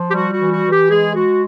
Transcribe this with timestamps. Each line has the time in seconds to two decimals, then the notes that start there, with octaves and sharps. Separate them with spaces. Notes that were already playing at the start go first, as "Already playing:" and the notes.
Already playing: F3
0.09 G4
0.14 G3 F#4
0.33 F#4
0.40 E3
0.52 F#4
0.65 E3
0.71 G4
0.90 G#3 G#4
1.15 G#3 F#4